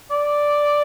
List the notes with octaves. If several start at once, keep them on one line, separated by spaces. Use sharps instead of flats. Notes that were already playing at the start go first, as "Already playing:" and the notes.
D5